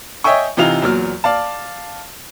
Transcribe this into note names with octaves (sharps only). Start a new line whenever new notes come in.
C#5 D#5 E5 G5 G#5 C#6
C3 E3 D#4 F4 F7
E2 A#2 F#3 F6
D5 F5 A5